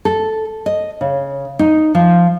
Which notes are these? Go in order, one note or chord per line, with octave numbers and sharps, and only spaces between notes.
A4
D#5
C#3
D#4
F3